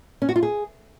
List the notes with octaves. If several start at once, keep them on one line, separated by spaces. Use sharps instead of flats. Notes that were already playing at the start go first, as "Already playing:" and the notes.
C#4
F#4
F4
G#4